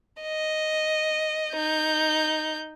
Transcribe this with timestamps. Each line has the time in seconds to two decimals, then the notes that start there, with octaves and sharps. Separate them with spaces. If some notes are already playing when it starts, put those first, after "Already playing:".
0.22 D#5
1.54 D#4 G6